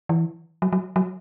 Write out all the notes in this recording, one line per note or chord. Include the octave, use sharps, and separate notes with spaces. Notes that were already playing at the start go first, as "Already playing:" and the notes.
E3
F#3
F#3
F#3